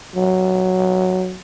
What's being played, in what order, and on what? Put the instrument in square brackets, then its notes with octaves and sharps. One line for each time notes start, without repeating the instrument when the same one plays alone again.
[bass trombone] F#3